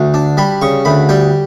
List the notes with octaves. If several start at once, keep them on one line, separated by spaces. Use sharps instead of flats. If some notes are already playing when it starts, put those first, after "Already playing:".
Already playing: D2
D4
G3 B5
C#3 C#6
D2 B5
G3 G5